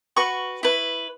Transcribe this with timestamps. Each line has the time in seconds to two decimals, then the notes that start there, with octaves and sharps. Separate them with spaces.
0.17 F#4 B4 C#6
0.63 E4 B4